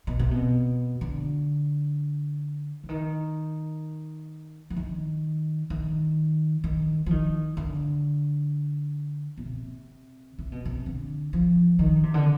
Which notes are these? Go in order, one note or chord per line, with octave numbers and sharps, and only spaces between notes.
B2
C3
B2
D3
D3
D#3
F3
D#3
D#3
D#3
F3
D#3
D3
B2
C3
C3
B2
C3
D3
F3
D#3
C3
D3